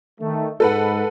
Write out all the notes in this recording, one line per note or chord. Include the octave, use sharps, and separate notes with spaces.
D#3 A3
G#2 A4 B4 F#5